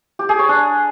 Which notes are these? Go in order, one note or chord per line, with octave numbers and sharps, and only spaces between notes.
G4
G#4
C#5
D4